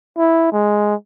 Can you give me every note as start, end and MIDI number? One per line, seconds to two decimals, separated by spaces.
0.17 0.48 64
0.52 0.95 56